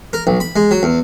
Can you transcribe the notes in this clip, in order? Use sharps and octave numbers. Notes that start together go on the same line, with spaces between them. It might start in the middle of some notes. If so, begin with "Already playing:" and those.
A#4
B1
B5
G#3
F#3
E2